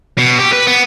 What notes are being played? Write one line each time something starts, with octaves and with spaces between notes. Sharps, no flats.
B2
G4
B4
B3